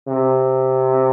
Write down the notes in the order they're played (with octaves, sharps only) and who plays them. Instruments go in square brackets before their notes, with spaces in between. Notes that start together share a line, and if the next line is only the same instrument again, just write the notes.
[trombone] C3